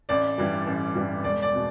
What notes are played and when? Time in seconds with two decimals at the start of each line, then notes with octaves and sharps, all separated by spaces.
0.09 A1 D5
0.38 G2 E3 G3
0.67 A1
0.95 G2 E3 G3
1.23 E1 D5
1.42 D5
1.55 B2